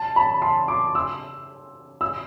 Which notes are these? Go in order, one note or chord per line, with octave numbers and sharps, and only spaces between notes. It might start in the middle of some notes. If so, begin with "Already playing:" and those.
Already playing: A5
B5
C6
D6
E6
E6